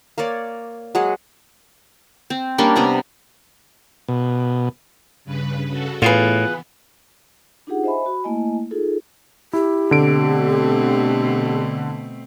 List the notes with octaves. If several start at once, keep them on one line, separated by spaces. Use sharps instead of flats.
A#3 A#4 C#5 D5
F#3 G#3 G#4 F#5
C4
G3 A#3 C#4 D4
C3 B3 A#5
B2
G2 C#3 B4
C#3 F#4 A4
A2 E3 B3 F4 G#4 B4
D4 D#4 F4 G4 G#4 F#5
C5 D#5 E5 G#5 B5
F#4 B5
A3 A#3 E4 D#5 G#5
D#4 F4 G#4 A4
E4 G4
B2 D3 A3 C4 D7